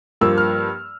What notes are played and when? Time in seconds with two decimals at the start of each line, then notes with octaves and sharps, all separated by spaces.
0.21 G2 F3 A#3 E6
0.38 F6